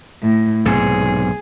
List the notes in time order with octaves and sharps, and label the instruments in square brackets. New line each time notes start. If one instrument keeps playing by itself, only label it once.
[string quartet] A2
[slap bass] B1 G#2 C3 [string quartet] G#4